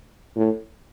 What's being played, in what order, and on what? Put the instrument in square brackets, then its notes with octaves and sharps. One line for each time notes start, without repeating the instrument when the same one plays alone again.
[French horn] A2